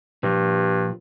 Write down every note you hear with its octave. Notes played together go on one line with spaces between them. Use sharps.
G2 A#2 F3